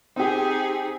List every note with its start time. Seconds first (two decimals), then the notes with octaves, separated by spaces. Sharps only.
0.16 C4 D#4 G4 G#4